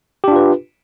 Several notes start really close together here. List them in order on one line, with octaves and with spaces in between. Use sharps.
G4 D4 F4 B4